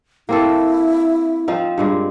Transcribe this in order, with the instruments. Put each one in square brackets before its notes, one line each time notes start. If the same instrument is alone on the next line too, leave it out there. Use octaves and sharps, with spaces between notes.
[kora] A#3 C4 A4 [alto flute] E4
[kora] F3 C4 D#4
G2 A#2 G#3